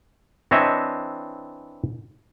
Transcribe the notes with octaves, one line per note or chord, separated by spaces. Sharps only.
E3 C4 D4 C#5 D#5 E5